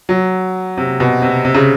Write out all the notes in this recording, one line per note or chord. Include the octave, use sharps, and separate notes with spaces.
F#3
C3
B2
C3
C3
C#3